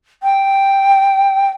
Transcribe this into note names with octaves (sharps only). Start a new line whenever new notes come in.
G5